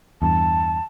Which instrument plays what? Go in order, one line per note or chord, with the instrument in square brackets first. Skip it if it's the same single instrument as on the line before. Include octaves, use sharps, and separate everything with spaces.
[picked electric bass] E2 G2 [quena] A5